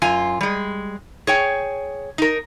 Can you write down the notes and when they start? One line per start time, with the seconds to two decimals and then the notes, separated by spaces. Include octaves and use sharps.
0.02 F#2 F4 G#5
0.41 G3 G#3
1.27 G#4 C#5 G5
2.18 D#4 A#4